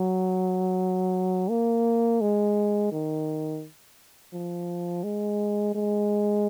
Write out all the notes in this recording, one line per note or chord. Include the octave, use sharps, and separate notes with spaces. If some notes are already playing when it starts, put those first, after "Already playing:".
Already playing: F#3
A#3
G#3
D#3
F3
G#3
G#3